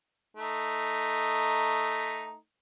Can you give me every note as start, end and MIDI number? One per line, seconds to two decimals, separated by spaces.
0.37 2.36 57
0.37 2.36 63